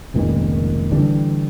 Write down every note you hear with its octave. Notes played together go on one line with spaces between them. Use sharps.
F1 C#2 A#2 D#3
D3 E3 G3